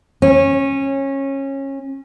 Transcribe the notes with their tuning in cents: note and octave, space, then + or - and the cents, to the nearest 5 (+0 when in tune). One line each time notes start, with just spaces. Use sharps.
C#4 -20